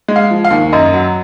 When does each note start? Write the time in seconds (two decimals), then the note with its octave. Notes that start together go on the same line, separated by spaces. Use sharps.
0.08 G#3
0.16 F5
0.31 F3
0.45 F5
0.50 D#2
0.73 F#2 D#5
0.93 F#3